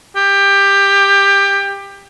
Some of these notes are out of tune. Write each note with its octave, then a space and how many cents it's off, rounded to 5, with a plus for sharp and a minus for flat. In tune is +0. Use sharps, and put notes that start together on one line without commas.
G4 +20